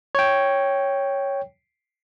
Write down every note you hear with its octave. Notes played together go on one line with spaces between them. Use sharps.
C#5 G5